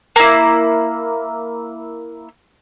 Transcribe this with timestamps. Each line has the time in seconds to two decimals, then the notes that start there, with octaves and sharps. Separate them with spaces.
0.16 A#3 E4